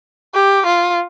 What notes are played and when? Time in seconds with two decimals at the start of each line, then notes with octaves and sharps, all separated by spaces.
0.34 G4
0.66 F4